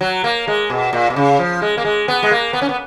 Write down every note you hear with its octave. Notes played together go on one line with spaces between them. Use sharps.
F#3
A#3
G#3
B2
A#2
B2
C#3
F3
G#3
A#3
G#3
B3
G#3
A#3
B3
C#4
B3